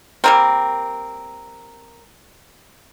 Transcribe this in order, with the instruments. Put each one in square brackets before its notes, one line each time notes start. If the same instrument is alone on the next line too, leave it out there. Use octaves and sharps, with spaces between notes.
[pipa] G3 A#3 C4 [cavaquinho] A#4